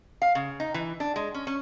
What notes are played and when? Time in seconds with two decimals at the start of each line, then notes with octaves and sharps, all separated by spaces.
0.22 F5
0.35 C#3
0.60 D#4
0.74 E3
1.00 D4
1.16 G#3
1.34 C#4
1.47 C#4